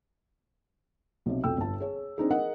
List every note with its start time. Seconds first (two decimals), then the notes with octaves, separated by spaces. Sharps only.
1.26 B1 C3
1.44 B1 F2 A4 G5 E6
1.57 G1 A5
1.80 G#4 C#5
2.18 C4 D4 D#4 G#4
2.30 G#4 A#4 D#5 F#5